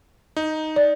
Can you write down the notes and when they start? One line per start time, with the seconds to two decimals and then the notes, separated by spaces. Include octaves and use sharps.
0.37 D#4
0.76 D5